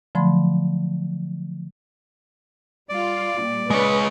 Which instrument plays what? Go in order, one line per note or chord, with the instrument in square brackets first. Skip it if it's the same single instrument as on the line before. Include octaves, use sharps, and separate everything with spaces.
[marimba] D3 F3 F#3 A3 B5 C6
[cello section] G3 F4 [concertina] D5
[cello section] A#2 G3
[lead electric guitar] G#3 C#5 [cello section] B4